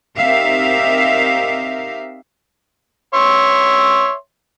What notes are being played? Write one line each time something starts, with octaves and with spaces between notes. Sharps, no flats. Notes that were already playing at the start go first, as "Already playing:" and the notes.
C4 D#4 G4 A#4 E5 F5
C#5 E5 C6